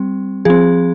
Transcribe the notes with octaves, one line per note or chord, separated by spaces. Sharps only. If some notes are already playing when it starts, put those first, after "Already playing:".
Already playing: G3 C4
F3 C4 G#4